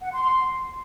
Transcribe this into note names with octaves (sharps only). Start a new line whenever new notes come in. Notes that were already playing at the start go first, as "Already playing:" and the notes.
F#5
C6
C6